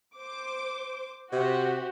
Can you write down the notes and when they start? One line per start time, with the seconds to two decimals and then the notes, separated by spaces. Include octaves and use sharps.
0.17 C5 D6
1.32 C3 F#4 G4 C5